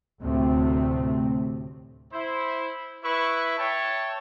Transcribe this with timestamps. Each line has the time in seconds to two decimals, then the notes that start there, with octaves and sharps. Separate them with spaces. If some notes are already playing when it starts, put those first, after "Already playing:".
0.22 D2 A2 C3 A3 C4
2.13 E4 C5
3.04 E4 B4 E5 C#6
3.58 C#5 E5 G5 A5